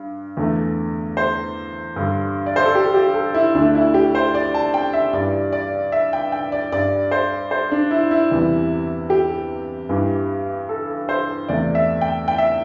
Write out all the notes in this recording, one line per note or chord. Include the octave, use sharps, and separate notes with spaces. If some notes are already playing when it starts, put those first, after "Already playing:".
Already playing: G2
E2 D3 A3
C5
G2 D3 G3
D5
C5
A4
G4
G4
A4
E4
D2 D3 A3 D4
E4
G4
C5
D5
A5
G5
E5
G2 E3 G3 D5
D5
E5
G5
G5
D5
G2 G3 D5
C5
C5
D4
E4
E4
E2 C3 E3 G3
G4
G2 E3 G3
A4
C5
E2 C3 A3 D5
E5
G5
G5
E5